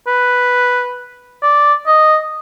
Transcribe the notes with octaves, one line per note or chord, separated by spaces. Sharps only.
B4
D5
D#5